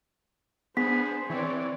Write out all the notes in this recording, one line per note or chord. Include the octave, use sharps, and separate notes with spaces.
B3 D4 G#4 C5 B6
E3 C4 C#5 D5